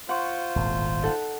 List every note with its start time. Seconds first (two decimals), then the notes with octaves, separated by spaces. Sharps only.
0.09 F4 C5 F#5 C#6
0.56 D#1 G#1 A2
1.02 D#4 A4 F#5